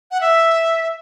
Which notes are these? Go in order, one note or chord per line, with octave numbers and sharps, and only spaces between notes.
F#5
E5